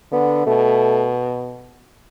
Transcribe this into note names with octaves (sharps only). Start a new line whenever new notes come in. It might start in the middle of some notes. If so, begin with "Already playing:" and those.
D3 B3
B2 A3